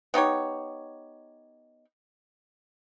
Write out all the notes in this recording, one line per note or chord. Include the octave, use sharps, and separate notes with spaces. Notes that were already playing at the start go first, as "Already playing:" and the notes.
B3 D#4 G4 C#5